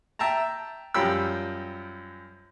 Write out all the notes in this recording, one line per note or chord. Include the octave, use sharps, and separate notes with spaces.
E5 G5 A5 A#5
F#2 F3 G3 G5 B5 E6